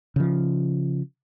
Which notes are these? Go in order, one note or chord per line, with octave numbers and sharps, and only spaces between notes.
C#3 F3